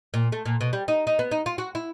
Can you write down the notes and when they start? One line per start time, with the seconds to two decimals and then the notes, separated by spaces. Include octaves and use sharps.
0.14 A#2
0.32 A3
0.46 A#2
0.61 B2
0.73 G3
0.88 D#4
1.07 D#4
1.19 B3
1.31 D#4
1.46 F4
1.58 F#4
1.75 E4